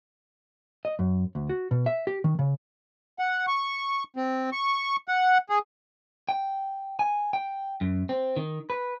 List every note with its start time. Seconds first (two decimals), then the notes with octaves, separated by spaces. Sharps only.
0.85 D#5
0.99 F#2
1.35 D2
1.49 F#4
1.71 B2
1.86 E5
2.07 G4
2.24 D#3
2.39 C#3
3.19 F#5
3.47 C#6
4.17 C4
4.53 C#6
5.08 F#5
5.50 G#4
6.29 G5
6.99 G#5
7.33 G5
7.81 F#2
8.09 C4
8.36 D#3
8.70 B4